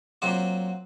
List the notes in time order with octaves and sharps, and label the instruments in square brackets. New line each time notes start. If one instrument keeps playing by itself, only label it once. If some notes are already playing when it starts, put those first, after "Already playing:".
[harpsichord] A#2 F#3 C4 F#4